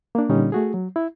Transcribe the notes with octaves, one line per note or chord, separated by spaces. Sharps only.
A#3 D4
A#2 D3 G3 C#4 D#4
A3 F#4 G#4
F#3
E4